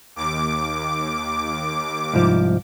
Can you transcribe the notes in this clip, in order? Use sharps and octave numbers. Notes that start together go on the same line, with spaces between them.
D#2 D6
C2 G#2 F3